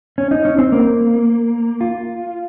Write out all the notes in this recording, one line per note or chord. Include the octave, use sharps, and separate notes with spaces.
C#4
D#4
C#4
C4
A#3
F4